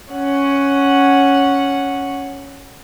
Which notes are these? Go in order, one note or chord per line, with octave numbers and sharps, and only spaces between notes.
C#4 F#5